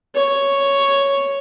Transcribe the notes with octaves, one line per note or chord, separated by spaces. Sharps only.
C#5